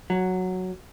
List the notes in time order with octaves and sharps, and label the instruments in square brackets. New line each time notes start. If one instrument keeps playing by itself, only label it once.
[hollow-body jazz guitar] F#3